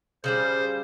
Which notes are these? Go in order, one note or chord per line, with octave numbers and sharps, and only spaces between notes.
C#3 E3 G3 C5